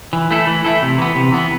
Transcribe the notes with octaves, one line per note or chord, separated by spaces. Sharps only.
E3
A3 E4 A4
E3
A3 E4 A4
C3
E3 B3
C3
E3 B3